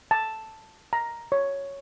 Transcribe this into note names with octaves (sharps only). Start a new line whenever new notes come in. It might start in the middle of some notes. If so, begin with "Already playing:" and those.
A5
A#5
C#5